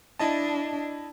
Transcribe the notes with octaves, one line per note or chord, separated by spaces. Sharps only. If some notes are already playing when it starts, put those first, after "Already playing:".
D4 E4 D#5 A5